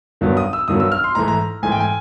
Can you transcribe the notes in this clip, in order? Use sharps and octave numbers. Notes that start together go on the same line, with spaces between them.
G2 D#3 F#3 B3
D#6
E6
G2 D#3 F#3 B3 D#6
E6
F6
C6
G#2 E3 A3 A#5
A#5
G#2 E3 A3 G#5
G5
G#5